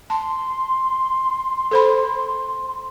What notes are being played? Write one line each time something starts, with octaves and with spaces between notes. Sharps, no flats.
A5 C6
A4 C5 B5